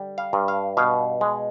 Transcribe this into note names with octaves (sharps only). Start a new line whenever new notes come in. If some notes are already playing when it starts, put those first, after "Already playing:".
Already playing: D3 G3
F5
G2
F5
B2 F5
G#3